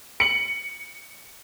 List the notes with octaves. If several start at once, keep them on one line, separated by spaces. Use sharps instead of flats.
C#7 F#7